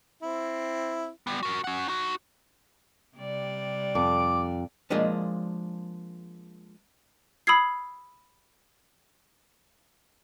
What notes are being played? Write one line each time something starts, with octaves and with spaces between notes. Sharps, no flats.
C4 E4
G3 B3
F#4 A#4
C#4 F#5
D#4 F#4
C3 G3 D5
F2 D6
F3 G#3 A#3 D4 D#5
B5 D#6 E6 G#6 C7